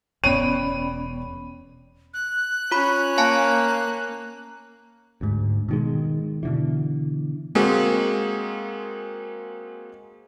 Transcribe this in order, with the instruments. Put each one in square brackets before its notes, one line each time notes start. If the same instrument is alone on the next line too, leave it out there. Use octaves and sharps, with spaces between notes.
[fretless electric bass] E1 B3 [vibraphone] C#4 D5 B5 [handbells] C#5 G5 [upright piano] D#7
[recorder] F#6
[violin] C#4 [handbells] F4 B5
[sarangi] A#3 [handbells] F5 G#5 A5
[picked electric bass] D2 G#2
B2 D#3 G#3
B2 D3 E3
[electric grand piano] G#3 A#3 C4 F#4 G#4